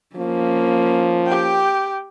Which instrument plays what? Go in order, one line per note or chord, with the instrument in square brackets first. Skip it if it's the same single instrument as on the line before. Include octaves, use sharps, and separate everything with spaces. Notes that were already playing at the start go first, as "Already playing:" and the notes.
[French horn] F3 [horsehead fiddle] A#3 C#4
[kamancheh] G4 G5